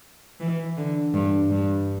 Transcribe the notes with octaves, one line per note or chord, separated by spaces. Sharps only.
E3
D3
G2
G2